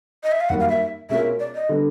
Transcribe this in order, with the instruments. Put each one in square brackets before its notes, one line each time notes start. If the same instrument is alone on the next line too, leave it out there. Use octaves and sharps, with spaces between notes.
[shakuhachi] D#5
E5
F5
[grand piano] F#2 D#3 G3 A#3 [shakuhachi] F#5
[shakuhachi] F5
E5
[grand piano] B2 G#3 C#4 F4 A#4 [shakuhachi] E5
[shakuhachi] D5
D#5
[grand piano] D3 G3 B3